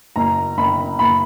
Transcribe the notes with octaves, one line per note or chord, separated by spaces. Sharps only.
F#1 A#5
F#1 B5
F#1 B5